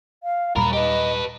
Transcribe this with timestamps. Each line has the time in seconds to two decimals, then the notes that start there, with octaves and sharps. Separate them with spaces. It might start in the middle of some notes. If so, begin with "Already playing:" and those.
0.23 F5
0.56 D#2 A#2 F#3 G3 A#4 B5
0.73 G4 B4 D#5